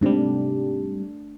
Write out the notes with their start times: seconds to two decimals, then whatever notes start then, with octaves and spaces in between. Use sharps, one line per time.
0.01 G#2 C3 G3 A3 D4